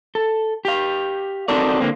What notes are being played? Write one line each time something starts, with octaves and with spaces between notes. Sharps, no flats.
A4
G4 F5
C4 D#4 F#4 A4 A#4 D5
D3 A#3 C4